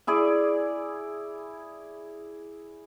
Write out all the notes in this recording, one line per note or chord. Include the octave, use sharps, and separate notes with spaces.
E4 G#4 D5